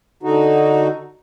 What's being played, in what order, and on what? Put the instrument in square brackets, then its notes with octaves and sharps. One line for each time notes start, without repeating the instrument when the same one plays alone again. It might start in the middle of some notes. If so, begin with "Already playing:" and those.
[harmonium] D3 D#4 F#4